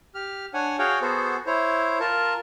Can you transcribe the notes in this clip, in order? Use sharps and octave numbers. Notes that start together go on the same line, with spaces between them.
G4 F6
D4 C#5 F#5 G#5
F#4 G#4 C#5 F5 G5
B3 F#4 G#4 A4 C5
E4 C5 C#5
F4 A#4 A5